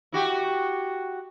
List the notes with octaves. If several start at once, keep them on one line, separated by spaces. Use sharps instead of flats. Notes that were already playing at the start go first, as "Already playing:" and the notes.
E4 F#4 G4